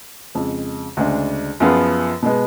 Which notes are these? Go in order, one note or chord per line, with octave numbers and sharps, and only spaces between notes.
F2 C#3 G#3
D2 C#3 G#3 D4
F#2 F3 B3 F4 G#4
B2 G#3 B3